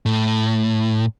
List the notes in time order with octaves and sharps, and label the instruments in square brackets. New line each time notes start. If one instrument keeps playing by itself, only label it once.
[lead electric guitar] A2